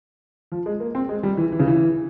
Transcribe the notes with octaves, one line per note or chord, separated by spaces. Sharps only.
F3
G#3
A#3
C4
G#3
G3
E3
E3
C#3
E3